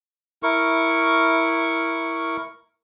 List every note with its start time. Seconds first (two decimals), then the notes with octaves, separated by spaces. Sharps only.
0.43 E4 A#4 C#6